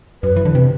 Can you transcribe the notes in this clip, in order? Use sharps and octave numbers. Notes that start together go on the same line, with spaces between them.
F#2 B4
E3
D3
C3